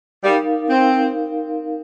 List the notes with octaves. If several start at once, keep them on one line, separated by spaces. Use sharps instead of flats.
G3 D#4 A#4 F5
C4